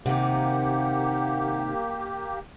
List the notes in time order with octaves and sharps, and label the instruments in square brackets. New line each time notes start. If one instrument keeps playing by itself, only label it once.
[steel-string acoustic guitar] C3 D#3 [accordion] A#3 G4 [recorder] F#5